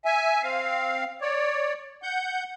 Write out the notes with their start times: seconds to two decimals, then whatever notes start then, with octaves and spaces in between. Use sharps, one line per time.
0.05 E5 G#5
0.42 C4 F5
1.21 C#5 D5
2.03 F#5 G6